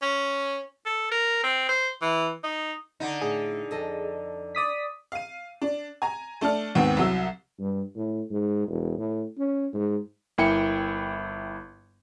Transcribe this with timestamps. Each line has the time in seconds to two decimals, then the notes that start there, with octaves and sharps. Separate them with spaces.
0.02 C#4
0.86 A4
1.12 A#4
1.44 C4
1.69 C5
2.02 E3
2.44 D#4
3.00 D3 D#4
3.21 A2 G#4
3.71 F2 A4 D#5
4.55 D5 D#6 B6
5.12 F5 D#7
5.62 D4
6.02 G#5 A#5
6.41 A3 D4 A5 F6
6.75 D#2 G#2 B3 C4
6.97 C2 F#3 E6
7.60 G2
7.96 A2
8.31 G#2
8.68 E1
8.98 A2
9.38 C#4
9.74 G#2
10.38 G1 A#3 E4 G5 G#5 C#7